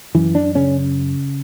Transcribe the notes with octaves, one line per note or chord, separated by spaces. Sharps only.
F#2 E3
D4
C#3 C#4